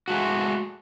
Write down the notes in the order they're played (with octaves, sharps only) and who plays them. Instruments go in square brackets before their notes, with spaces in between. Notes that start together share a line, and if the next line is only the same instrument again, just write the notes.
[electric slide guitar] G#3 A3 F#4